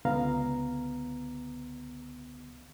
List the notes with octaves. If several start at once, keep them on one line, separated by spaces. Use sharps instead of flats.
C#2 D3 B3 F5 A#5